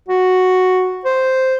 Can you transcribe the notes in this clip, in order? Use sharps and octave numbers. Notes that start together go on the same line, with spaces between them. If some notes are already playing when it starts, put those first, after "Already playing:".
F#4
C5